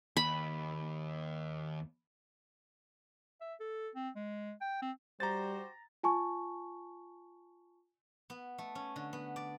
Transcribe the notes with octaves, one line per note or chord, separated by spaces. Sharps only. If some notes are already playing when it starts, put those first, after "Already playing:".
D#2 B5
E5
A4
C4
G#3
G5
C4
G3 F#4 G4 C5 A#5 A6
F4 G#5 A5 C#6
B3
A3
C#4
D3
B3
D5